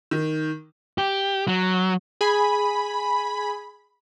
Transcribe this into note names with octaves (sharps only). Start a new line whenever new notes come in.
D#3
G4
F#3
G#4 G#5 B5